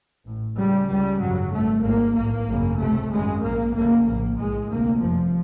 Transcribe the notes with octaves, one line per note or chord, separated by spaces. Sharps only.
A1 A2
C#2 C#3 G3
C#2 C#3 G3
G#1 F#2 C#3 F#3
G#1 G2 A3
G#1 G#2 A#3
B1 A2 A#3
G#1 F#2 C#3
C#2 C3 A3
G#1 F#2 C#3 G#3
A#1 A#2 A#3
G1 F2 C#3 A#3
A#1 A2 A#3
B1 A2 G#3
D2 C3 A#3
G1 F2 C3 F3